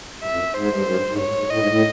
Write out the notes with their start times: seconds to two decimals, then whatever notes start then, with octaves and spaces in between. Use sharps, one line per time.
0.22 G2 E5
0.32 F2
0.39 F#2
0.54 G#2 C5
0.69 G2
0.82 F#2
0.96 G2
1.11 G#2
1.18 G2 C#5
1.28 G#2
1.39 G#2
1.50 A2 D#5
1.58 G#2
1.69 A2